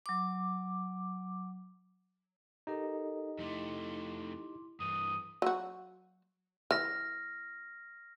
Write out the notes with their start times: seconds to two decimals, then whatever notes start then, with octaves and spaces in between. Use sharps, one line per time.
0.06 F#3 D6
2.67 D#4 G4 A4 A#4 D#5
3.38 F2 A3 E4 C6 D6
4.80 G2 E3 D#6
5.42 F#3 F#4
6.71 E3 F6 A#6